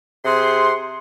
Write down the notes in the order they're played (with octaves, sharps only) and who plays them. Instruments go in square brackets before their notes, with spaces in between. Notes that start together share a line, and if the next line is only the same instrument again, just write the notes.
[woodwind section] C3 G#4 F#5 C6